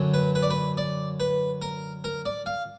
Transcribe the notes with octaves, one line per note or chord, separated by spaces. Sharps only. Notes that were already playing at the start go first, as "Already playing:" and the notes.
Already playing: F#2 D3 F#3
B4
B4
D5
B4
D5
B4
A#4
A#4
D5
F5